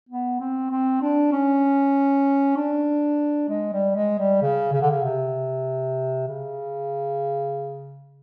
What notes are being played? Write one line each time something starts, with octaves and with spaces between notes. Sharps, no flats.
B3
C4
C4
D4
C#4
D4
G#3
G3
G#3
G3
C#3
C#3
D3
C#3
C3
C#3